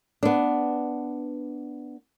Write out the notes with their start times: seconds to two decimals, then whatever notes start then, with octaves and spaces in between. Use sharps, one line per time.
0.23 B3 D4